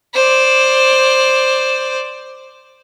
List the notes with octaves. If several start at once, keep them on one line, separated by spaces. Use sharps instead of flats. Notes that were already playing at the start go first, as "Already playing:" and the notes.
C5 D5